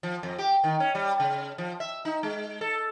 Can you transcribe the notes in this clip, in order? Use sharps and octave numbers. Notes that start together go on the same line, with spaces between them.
F3
F2
G4
D#3
C#4
G3
C#3
F3
E5
D#4
G#3
A4